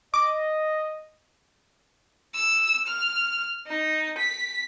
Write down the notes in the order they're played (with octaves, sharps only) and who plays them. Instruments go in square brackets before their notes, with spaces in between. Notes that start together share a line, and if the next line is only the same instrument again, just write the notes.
[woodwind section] D#5 [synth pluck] D6
[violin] E6
F6
D#4
B6